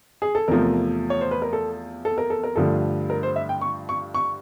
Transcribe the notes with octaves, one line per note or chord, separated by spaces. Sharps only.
G#4
A4
E2 C3 F3 A3 A#4
C#5
C5
B4
A#4
A4
A4
A#4
A4
A#4
G2 D3 F3 A3 A4
A#4
C5
E5
G5
C#6
C#6
C#6